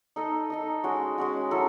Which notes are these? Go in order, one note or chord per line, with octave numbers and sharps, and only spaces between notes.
D#4 A4 D#5
D#4 A4 D#5
G#3 C#4 F#4
G#3 C#4 F#4
F#3 C#4 E4 A4